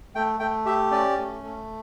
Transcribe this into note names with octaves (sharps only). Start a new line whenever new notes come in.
A3 G5
A3 G5
G4 E5
C#4 D5
A3
A3